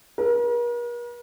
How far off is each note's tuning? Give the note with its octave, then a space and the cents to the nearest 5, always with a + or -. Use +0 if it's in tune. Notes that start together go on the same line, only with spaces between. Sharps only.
A#4 +45